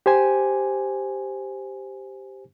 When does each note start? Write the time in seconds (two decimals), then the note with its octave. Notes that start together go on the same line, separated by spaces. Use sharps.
0.06 G4 C5 G#5